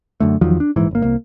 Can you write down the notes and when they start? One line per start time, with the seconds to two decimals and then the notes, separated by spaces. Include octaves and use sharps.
0.20 F#2 D3 A3
0.41 E2 D#3 F3 F#3
0.60 D4
0.76 A#1 G#2 E3
0.91 G1 A#3
1.02 C2 A#3